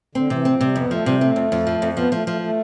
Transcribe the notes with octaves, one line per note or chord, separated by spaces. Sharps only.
D3 C4
C3 E3
F3 C4
C3 G3
F2 B3
F3 A3
C3 G3
A3 C4
F2
F2
F3
F2
F3 B3
F3 A3
F3 A3
A3